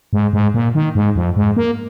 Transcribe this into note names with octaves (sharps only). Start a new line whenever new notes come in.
G#2
G#2
A#2
D#3
G#2
F2
G#2
A#3